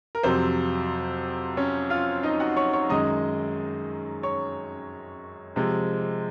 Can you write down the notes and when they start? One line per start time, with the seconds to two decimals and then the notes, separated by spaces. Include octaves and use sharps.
0.15 A#4
0.23 F2 C3 F#3 C5
1.57 C#4 C#5
1.90 F4 F5
2.23 D#4 D#5
2.40 F#4 F#5
2.56 C#5 C#6
2.73 C#5 C#6
2.90 F#2 D#3 G#3 D#5 D#6
4.23 C#5 C#6
5.56 C3 F3 G#3